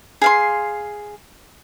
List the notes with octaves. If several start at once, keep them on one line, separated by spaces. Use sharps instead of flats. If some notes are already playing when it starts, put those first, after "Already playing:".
G#4 F5 C6